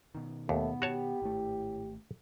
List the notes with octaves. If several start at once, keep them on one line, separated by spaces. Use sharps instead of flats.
B2 D#3
D#2 A3 B3
F#4 G4 C#5 A5
G#1 A2 A3